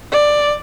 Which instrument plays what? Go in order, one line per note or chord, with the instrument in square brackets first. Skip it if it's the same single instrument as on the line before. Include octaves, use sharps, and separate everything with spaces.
[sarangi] D5